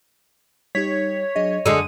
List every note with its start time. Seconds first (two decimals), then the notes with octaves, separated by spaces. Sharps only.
0.75 G3 D#4 G4 C#5 B6
1.36 F#3 D4 G#4 D#5
1.66 F#2 D3 G#3 D#6 D#7